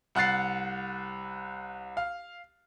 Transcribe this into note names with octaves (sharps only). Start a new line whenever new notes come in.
C2 F#5 F#6 A6 C7
F5